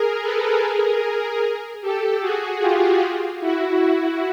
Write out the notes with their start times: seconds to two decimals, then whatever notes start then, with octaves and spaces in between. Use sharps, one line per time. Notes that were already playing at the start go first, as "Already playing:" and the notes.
Already playing: G#4 A#4
0.22 A4 B4
0.62 G#4 A#4
1.82 G4 A4
2.21 F#4 G#4
2.61 F4 G4
3.41 E4 F#4